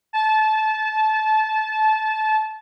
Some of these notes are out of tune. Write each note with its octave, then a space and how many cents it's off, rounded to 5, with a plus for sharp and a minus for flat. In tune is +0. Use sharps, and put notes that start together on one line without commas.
A5 -20